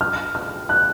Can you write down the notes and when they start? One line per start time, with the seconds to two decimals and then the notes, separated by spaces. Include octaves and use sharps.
0.01 F6
0.35 F6
0.69 F#6